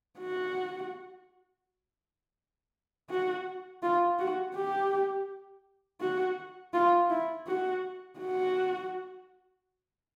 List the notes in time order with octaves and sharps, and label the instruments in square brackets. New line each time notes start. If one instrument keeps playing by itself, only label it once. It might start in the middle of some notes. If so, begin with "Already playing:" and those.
[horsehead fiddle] F#4
F#4
F4
F#4
G4
F#4
F4
E4
F#4
F#4